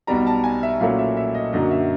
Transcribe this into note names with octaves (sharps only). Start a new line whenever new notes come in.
B1 B2 G3 A#5
A5
G#5
E5
A#2 F#3 A3 C#4 E4 F5
E5
E5
D#5
F#2 D3 F#3 A#3 D#5
E5